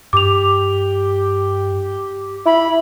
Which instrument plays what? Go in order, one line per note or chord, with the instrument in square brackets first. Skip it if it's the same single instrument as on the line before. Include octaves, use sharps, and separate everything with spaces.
[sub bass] G2 [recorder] G4 [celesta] D6 F7
[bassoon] E4 [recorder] B5